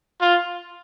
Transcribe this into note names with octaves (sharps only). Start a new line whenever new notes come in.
F4